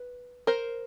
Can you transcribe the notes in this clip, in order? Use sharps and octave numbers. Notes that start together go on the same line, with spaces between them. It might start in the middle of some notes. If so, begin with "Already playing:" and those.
Already playing: B4
A#4 C5